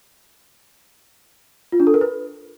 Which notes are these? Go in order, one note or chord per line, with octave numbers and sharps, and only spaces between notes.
F4
D4
A4
A#4
B4